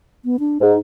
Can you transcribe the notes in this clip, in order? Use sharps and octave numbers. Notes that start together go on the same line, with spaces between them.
B3
D4
G#2 D#4